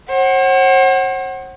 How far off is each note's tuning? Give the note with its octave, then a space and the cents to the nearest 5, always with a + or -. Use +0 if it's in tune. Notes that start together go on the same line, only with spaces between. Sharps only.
C5 +45 F#5 +20